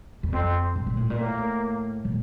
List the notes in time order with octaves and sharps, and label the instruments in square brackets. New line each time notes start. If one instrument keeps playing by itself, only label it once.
[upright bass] E2
[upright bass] F2 [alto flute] C4
[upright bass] G2
A#2
A2
A#2
[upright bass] A2 [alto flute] A#3
[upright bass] A#2